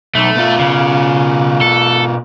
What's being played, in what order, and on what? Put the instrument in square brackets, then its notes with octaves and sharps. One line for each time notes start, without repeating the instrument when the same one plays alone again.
[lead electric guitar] B1 [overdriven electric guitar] A3
[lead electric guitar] B2 F4
[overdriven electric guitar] C#3
A4